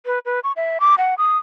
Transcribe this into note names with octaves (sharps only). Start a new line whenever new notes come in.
B4
B4
C#6
E5
D6
F#5
D#6